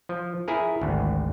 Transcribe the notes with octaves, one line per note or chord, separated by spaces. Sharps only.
F3
E4 G#4 A#4
G#1 D2